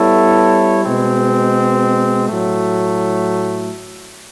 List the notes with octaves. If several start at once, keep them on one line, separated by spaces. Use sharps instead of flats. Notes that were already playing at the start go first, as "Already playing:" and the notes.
Already playing: G3 B3 E4 A4 C#5
B2 G#3 C4
A2 F#3 A3